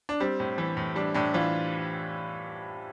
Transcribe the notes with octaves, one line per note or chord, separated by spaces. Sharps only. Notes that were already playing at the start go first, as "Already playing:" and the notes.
D4
G3 C4
A2
E3
A2
G3 D4
A2 D4
E3 F4